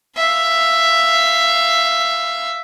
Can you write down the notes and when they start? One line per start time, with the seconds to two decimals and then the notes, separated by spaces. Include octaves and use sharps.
0.17 E5 F5